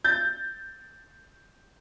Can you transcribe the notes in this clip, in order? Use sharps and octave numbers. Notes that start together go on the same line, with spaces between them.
G6 A6